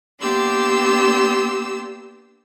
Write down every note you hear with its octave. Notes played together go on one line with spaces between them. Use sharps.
A#3 B3 D4 G4 C6 E6